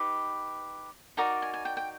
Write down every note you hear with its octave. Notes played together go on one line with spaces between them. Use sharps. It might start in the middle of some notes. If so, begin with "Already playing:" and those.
Already playing: D#4 G4 B4
D#4 F#4 A#4 D5 A#5
G#5
G#5
G5
G5